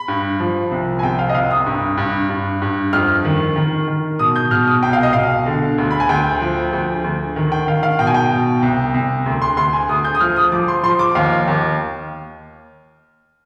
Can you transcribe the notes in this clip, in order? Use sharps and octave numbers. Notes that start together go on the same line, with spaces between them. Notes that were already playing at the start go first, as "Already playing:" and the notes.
Already playing: B5
G2
F3
C2
G#5
C3 G5
F5
D#5
C2 F5
D#6
G2
G2
G2
G2
F2 F6
D#3
D#3
D#3
B2 D#6
G6
B2 F6
D#6
C2 G5
F5
D#5
B2 F5
D3
D2
B5
G#5
D2 G5
F3
D2
D2
D#3
G5
D#3 F5
F5
B2 G5
G#5
G5
B2
C2
C2
D2
C6
D2 C6
G#5
D2 D#6
G6
D#6
F3 F6
D#6
F3 D6
C6
F3 C6
D6
D#2 F5
D#2